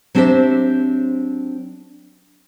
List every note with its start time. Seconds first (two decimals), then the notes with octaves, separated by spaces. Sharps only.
0.15 F#3 C4 D4 G4 C5 E5